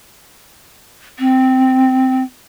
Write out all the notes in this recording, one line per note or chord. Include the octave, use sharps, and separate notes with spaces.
C4